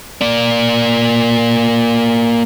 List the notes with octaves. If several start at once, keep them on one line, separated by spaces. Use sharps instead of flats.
A#3 D5